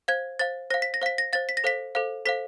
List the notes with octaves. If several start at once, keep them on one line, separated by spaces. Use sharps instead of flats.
C5 F5 G#6
C5 F5 A6
C5 F5 A#6
B6
A#6
C5 F5 B6
A#6
C5 F5 A6
B6
A#6
A4 C5 F5 B6
A4 C5 F5
A4 C5 F5 B6